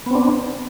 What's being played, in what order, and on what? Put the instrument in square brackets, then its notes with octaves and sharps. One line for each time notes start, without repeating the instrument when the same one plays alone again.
[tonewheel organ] B3
C4
D4